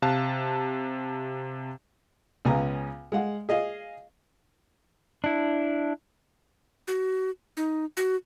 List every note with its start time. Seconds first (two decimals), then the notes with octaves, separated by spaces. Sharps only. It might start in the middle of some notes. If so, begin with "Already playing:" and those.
0.02 C3 F5 A5 F#6
2.45 C#2 C#3 B3 G#5 A#5
3.12 G#3 F5 F#5
3.49 G#4 D#5 F5
5.24 D4 E4
6.88 F#4
7.57 D#4
7.97 F#4